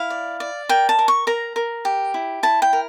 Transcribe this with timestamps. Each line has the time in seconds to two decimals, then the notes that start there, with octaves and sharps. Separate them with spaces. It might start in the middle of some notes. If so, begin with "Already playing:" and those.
Already playing: E4 F5
0.10 D5
0.40 D5
0.69 A#4 G5
0.89 A5
0.99 A#4
1.08 C#6
1.27 A#4 A#5
1.56 A#4
1.85 G4
2.14 E4
2.43 E4 A5
2.62 G5
2.73 A#4